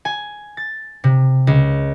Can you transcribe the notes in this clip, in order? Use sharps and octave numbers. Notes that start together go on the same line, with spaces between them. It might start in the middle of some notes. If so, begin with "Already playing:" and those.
G#5
A6
C3
C#2